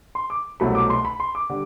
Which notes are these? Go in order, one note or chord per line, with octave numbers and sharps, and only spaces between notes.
C6
D6
C2 B2 F#3 A3 B5
D6
C6
B5
C6
D6
D3 G3